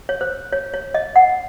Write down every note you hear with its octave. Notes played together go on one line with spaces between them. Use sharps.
C#5
C5
C#5
C#5
D#5
F#5